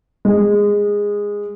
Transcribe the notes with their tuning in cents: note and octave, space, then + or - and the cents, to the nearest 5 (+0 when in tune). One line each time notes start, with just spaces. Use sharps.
G#3 -15